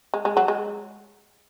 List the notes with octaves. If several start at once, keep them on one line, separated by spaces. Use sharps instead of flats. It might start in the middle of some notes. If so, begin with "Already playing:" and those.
G#3
G#3
F#3
G#3